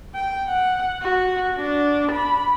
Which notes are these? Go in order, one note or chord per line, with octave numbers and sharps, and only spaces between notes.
G5
F#5
F#4
D4
B5